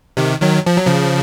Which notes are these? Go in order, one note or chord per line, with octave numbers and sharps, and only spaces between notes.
C3 D#3
D#3 F#3
F3
F#3
C#3 F3